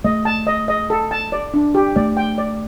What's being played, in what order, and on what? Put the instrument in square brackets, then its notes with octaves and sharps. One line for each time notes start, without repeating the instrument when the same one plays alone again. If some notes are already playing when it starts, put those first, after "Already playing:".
[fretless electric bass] A3 [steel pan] D#5
[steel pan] A5
D#5
D#5
A4
A5
D5
D4
G4
[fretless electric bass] A3 [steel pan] D5
[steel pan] G5
D5